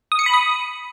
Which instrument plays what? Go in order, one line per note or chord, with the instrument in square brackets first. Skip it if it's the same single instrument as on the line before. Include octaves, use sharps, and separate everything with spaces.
[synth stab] D#6
C#7
B5
D#6